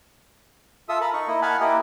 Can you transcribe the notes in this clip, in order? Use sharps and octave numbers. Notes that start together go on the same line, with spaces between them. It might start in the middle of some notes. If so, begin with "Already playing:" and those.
F4 A4 E5 D#6 E6
A#4 A5 B5
D#4 C#6
A#3 E4 D#5
F5 F#5 G#5 A5 B5
A#3 E4 G4 D#5